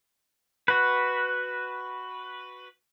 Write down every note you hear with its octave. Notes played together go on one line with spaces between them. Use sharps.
F#4 B4